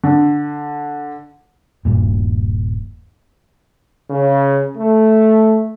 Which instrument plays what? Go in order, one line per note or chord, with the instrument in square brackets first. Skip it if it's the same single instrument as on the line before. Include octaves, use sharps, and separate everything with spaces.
[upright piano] D3
[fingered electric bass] D#1 G2 A#2
[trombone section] C#3
A3